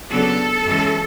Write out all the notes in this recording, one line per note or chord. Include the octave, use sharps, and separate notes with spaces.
C#3 F#3 B3 D4 A4
F#2 E3 G#3 C#4